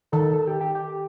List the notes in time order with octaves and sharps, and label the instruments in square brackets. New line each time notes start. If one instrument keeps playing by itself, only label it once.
[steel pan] D#3 [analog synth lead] A4
[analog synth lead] A4
G4
G4
G4